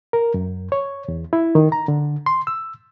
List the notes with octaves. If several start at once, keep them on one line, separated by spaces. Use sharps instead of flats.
A#4
F#2
C#5
E2
E4
D#3
A#5
D3
C6
E6